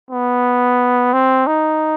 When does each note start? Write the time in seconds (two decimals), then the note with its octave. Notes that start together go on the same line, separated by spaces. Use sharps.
0.11 B3
1.13 C4
1.47 D#4